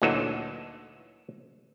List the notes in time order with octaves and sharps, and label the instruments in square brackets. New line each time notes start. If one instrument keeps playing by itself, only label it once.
[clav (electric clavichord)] D2 A#2 E3 F#3 D#4 A4